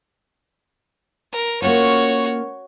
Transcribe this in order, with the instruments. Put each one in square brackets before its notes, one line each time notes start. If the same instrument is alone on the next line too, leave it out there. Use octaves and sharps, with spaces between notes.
[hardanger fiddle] A#4
[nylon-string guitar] A#3 C#4 F4 [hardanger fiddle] F#4 C#5